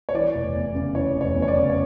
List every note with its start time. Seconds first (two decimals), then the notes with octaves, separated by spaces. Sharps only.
0.09 C#5
0.14 E3 D5
0.34 F1
0.55 E2
0.75 C#3
0.95 E3 C#5
1.15 F1
1.21 C#5
1.35 E2
1.42 C#5
1.48 D5
1.55 C#3
1.70 C#5